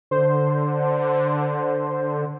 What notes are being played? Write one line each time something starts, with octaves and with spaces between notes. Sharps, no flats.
D3 C5